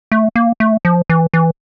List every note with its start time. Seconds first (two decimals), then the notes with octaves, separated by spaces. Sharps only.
0.12 A3
0.36 A#3
0.60 A3
0.85 F3
1.10 E3
1.34 E3